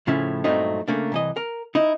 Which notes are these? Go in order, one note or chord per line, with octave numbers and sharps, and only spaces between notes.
A2 C#3 F3 C#4 E4
G2 A#2 F#3 A3 C4 D#4
C#3 A3 A#3 D4
C2 E3 D#5
A#4
D#4 E4